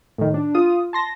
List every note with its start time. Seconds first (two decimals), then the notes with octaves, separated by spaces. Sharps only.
0.18 A2 D#3
0.34 D4
0.55 F4 D#6
0.93 A5 C6 A#6